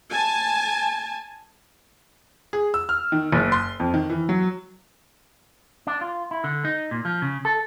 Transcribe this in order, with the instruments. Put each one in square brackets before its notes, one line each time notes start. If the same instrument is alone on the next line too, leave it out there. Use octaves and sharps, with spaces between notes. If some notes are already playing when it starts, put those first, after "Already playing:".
[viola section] G#5 A5
[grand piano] G#4
E6
F6
D#3
F#1
C6
F2
D#3
E3
F#3
[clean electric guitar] D4
F4
E4
D3
D#4
A#2
F3
C#3
A4